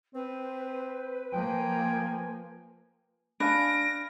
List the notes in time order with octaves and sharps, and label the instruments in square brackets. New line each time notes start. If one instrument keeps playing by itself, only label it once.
[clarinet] C4 [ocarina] B4 [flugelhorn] C5
[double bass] F3 A#3 [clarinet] G5 [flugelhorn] G#5
[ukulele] D4 [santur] B4 F5 G#5 [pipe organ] A#6 [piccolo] D7